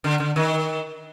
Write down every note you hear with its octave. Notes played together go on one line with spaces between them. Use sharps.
D3
D3
D#3